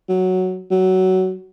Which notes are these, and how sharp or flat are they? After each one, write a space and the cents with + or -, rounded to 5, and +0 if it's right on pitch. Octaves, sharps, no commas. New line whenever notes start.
F#3 +0
F#3 +15